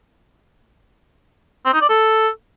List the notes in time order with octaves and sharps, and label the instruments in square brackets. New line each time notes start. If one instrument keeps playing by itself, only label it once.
[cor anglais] C4
D#4
D5
A4